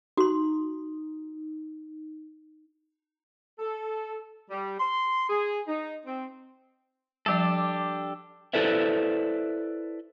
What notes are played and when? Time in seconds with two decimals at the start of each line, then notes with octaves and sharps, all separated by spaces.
0.17 D#4 F#4 C6
3.58 A4
4.50 G3
4.79 C6
5.29 G#4
5.67 D#4
6.05 C4
7.26 F3 G3 D4 G4 A4
8.54 E4 A4 B4 C5 D5 E5